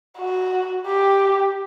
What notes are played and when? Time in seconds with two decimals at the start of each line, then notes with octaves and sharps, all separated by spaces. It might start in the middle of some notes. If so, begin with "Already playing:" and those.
0.19 F#4
0.87 G4